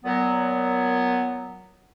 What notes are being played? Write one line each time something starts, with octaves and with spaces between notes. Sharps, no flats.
A#2 F#3 B3